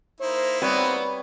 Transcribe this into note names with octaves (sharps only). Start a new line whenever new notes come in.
A#3 D#4 E4 C5
G3 B3 C4 B4 C#5